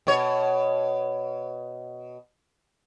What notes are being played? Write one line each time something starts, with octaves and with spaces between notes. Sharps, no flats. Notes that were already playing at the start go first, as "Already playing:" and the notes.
B2 C#5